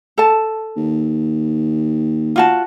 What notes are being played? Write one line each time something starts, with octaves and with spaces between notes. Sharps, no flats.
A4 A5
D#2
F4 F#4 A5